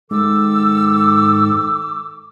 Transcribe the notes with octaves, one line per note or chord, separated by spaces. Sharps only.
G#2 D#3 A4 D6 E6